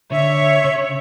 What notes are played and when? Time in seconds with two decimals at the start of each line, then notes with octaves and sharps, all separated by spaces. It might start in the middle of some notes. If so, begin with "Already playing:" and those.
0.12 D3 C#5 E5
0.64 C#3